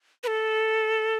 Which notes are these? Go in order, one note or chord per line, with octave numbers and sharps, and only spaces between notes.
B4
A4